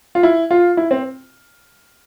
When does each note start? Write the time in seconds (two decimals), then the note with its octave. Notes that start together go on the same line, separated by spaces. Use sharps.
0.15 F4
0.23 E4
0.51 F4
0.77 E4
0.91 C4